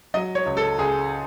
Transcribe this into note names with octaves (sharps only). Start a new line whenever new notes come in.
F#3 D#5
C#5
C#2
A4
C#2 G#4